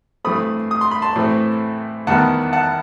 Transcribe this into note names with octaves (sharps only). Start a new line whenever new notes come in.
G2 E3 A3 C4 B5 D#6
D#6
C6
B5
A5 C6
A2 E3 A3 C4
E2 D#3 G3 B3 F#5 A5
F#5 A5